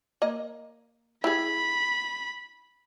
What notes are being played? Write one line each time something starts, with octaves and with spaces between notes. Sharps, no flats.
A#3 D#5
E4 G4 G#4 B5